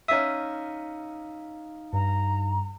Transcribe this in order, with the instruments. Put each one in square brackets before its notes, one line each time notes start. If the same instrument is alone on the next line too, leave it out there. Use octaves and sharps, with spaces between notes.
[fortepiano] C#4 E5 [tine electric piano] D#4 F5 D#6
[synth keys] G2 [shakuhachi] A#5